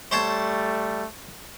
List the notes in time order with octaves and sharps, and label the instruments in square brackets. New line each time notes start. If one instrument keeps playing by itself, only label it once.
[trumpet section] G3 A3 [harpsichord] C5 C#5 A5